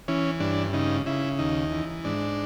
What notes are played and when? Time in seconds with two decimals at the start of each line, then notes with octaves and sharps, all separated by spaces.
0.08 E3 C#4
0.40 G2 D4
0.73 C#3 D#4
1.06 C#3 E4
1.39 D#2 D#4
1.72 E3
2.04 G#2 D4